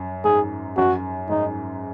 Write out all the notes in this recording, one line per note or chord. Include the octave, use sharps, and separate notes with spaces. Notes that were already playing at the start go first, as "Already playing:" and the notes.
Already playing: F#2
G#2 G#4
F#2 F#4
G#2 D#4